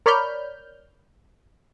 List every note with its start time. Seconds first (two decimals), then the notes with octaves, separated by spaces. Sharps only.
0.06 A#4 C#5 D5 B5 F6 G6